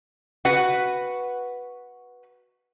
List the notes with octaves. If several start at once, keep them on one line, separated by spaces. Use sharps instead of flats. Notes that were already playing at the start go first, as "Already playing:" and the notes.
F#4 B4 F#5